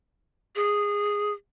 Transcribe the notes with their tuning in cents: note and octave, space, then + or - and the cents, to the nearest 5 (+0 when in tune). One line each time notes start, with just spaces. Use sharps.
G#4 -10